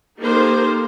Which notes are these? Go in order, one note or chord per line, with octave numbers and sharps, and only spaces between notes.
A#3 D#4 G4 A4 A#4 C5